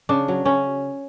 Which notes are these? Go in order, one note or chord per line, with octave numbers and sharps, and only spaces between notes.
C#3 D4
F#3
C#3 C#4